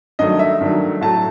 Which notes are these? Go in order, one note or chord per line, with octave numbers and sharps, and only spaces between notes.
G2 D#3 F#3 A3 D#5
E5
G2 D#3 F#3 A3
A2 F#3 A3 A5